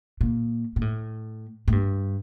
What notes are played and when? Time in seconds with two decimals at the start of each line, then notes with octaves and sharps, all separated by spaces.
0.21 A#2
0.76 A#2
0.82 A2
1.68 A2
1.72 G2